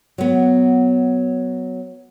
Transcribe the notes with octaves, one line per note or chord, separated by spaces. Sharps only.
F#3 B3